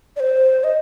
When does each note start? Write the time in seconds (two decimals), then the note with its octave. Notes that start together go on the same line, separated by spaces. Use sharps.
0.16 D5
0.20 C5
0.64 D#5